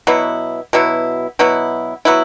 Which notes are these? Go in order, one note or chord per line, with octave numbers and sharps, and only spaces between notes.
B2 F#3 B3 E4
B2 F#3 B3 E4
B2 F#3 B3 E4
F#3 B3 E4